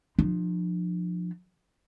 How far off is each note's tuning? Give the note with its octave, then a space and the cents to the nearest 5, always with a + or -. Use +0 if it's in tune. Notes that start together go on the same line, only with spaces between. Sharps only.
F3 +15 D4 +45